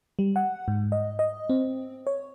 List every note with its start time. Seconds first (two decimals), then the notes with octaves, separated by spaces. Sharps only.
0.19 G3
0.36 F#5
0.68 G#2
0.92 D#5
1.19 D#5
1.50 C4
2.07 C#5